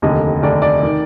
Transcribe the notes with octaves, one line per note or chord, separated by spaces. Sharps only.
F1 D#2 D3 D#5
F1 D#2 D3 D5
D5
D#3